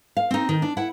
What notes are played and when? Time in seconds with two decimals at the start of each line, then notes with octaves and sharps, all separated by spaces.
0.17 F5
0.31 C4 D#4
0.49 D#3
0.62 D4
0.77 E4 F#5